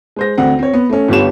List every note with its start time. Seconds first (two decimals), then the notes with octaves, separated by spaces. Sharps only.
0.16 G#3 C5 A#6
0.38 D2 D3 C4 F#5
0.59 C4 C#5
0.74 B3
0.89 A3 C#4
1.08 G1 B3 F4 G4 C#5 E7